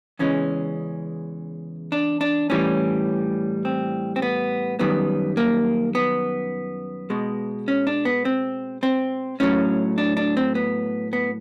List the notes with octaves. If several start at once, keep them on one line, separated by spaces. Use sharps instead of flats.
E2 C#3 E3 G#3 C#4
D4
D4
A2 E3 G3 C#4
C4
C4
B3
F#2 D#3 G3 B3
A#3
B3
B2 G#3
C#4
D4
B3
C4
C4
A2 F#3 C#4
D4
D4
C4
B3
B3